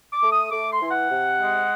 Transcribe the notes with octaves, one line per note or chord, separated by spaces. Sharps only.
D6
A3
D#6
A3 D6
C6
E3
F#5
C3
G#3